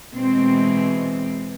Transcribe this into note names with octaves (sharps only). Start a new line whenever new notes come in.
B2 E3 G#3 C4